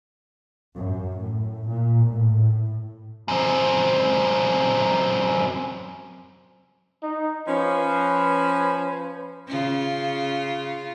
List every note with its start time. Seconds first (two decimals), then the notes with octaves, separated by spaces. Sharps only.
0.73 F#2
1.16 A2
1.69 A#2
2.07 A2
3.28 F#2 C4
7.02 D#4
7.48 F3 C#4 B4
9.47 C#3 F4